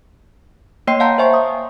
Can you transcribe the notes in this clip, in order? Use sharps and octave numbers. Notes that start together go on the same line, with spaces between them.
A#3 C#5 D#5 G5 C6 C7
F5 F#5 A5 A#5 C6 G6
C5 E5 G#5 C#6
D#6